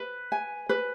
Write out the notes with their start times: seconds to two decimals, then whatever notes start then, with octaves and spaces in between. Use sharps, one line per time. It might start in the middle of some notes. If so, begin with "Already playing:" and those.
Already playing: B4
0.32 G#5
0.69 B4